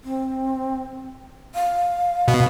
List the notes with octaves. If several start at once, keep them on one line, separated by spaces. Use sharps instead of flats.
C4
F5
B2